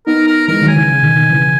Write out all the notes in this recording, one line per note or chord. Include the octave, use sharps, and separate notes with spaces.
B3 D#4 A#4
A#4
E3 G#3 A#4
D#3 F#3
G#5
C#3 E3
C#3
B2 D#3
B2 D#3
C#3 E3